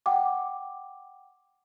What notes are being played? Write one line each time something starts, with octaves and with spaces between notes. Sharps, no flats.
F#5 G5 D6